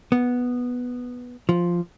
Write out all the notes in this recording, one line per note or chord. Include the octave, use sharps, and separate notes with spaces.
B3
F3